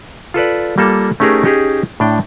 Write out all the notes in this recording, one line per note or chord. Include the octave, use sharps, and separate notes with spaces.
F4 A4 B4 D5
G3 A#3 F4 A4
A3 C#4 D#4 G4 G#4 A#4
C#4 D#4 G4 G#4
A2 D4 G5